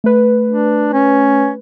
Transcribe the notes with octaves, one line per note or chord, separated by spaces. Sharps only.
A3 B4
D4
C#4